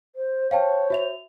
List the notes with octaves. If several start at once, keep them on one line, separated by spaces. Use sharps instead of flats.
C5
C5 C#5 F5 G5 A5
F#4 E5 F7